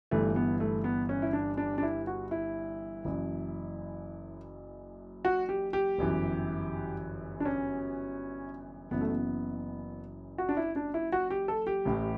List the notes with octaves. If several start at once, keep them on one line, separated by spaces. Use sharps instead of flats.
G1 G2 E3 A3
B3
A3
B3
C#4
E4
D4
D4
D4
E4
F#4
E4
F#1 F#2 E3
F#4
G4
G4
G1 F#2 E3
D4
C#4
F#1 F#2 E3 B3
A3
B3
F#4
D4
E4
D4
E4
F#4
G4
A4
G4
A1 A2 E3